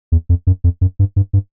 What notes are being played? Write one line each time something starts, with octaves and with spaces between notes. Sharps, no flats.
E2
F2
F#2
F2
F#2
G2
G2
G2